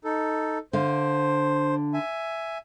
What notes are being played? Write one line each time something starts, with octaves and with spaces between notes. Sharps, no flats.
D#4 A4
D3 C5 F5
E5 G#5